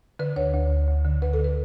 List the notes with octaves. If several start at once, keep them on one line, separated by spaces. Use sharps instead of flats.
D3 B4
D2 C#5
D2
D2
D2
D3
D2 B4
A4
D3
B4